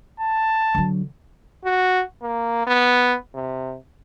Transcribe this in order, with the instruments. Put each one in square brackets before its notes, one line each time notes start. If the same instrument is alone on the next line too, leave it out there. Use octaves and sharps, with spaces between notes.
[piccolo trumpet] A5
[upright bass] D3 F#3
[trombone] F#4
A#3
B3
C3